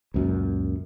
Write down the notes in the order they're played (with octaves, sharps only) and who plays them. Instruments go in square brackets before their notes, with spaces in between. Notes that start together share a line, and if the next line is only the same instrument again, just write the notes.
[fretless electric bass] C#2 F#2 A#2